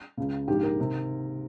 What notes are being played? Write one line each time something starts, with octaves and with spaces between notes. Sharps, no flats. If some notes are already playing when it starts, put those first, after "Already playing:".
C#2 C#3
A#1 G#2 D#3 G4
A#4
C3 D#3